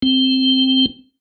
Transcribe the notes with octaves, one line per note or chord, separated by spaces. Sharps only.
C4